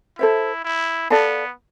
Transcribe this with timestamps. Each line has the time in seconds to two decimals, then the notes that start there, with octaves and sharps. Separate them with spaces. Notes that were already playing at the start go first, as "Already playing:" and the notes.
0.19 E4 A4 C5 E5
0.65 E4
1.10 B3 A4 D5 F5 A5